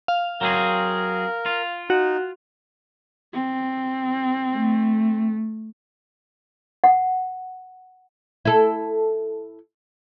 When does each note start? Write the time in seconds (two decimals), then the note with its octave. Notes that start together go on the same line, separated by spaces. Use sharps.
0.08 F5
0.41 F#3 C4 G#4 A#4
1.46 F4
1.90 D#4 F#4
3.33 C4
4.53 A3
6.84 F#5
8.45 E4 A4